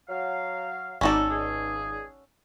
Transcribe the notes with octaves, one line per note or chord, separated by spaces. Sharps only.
F#3 F5
G#1 C#4 D#4 F#4 A4 D5
C#2 G#4